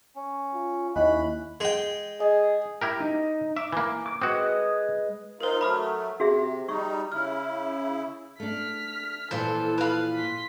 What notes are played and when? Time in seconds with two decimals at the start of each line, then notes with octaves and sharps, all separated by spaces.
0.16 C#4
0.54 F4
0.96 D#2 C#4 E4 D#5 B5 F#6
1.60 G#3 G5
2.20 G#4 D#5
2.81 E4 G4 A#4
3.00 D#4
3.57 E5 D6
3.73 E3 A#3
4.06 D6
4.22 G#3 C4 F#4 B4 D#6
5.40 D#4 F4 A#4 C5 F5
5.61 F#3 A3 B5 D#6 F6
6.20 C3 F#4 G#4 E5
6.69 G3 D#4 C#6
7.12 C#3 E4 F6
8.40 A3 D4 F6 B6
9.31 A#2 E3 F3 A4 C5
9.78 B4 F5
10.16 C6 B6